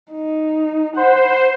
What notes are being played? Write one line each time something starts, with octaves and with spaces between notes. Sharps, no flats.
D#4
C5 F#5 B5